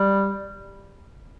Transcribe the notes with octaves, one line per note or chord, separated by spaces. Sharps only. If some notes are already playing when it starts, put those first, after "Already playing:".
Already playing: G3